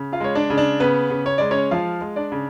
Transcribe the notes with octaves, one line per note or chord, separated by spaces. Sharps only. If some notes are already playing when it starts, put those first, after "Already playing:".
Already playing: C#3
F4 F5
G#3 C#5
D4 D5
C#3
D4 D5
C#3 B3 B4
C#3
C#5
G#3 D5
C#4 C#5
F3 F4 F5
G#3
D4 D5
C#3